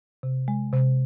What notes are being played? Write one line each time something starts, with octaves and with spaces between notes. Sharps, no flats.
C3
G#3
C3